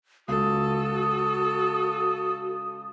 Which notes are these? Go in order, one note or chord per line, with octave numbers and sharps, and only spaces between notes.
C#2 F#4 A4 D#6